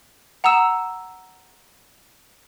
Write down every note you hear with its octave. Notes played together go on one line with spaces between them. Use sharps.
F#5 A#5 D#6 E6 E7